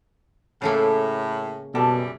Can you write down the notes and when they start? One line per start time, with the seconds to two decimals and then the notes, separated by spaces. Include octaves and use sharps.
0.62 A2 C#3 A3 A#3
1.75 F#2 B2 E3 G3 G4 A4